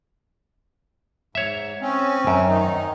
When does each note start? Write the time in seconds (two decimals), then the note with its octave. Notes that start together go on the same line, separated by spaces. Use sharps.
1.35 G#2 C#5 E5
1.81 C4 C#4
2.27 F#2
2.48 D#3 D#4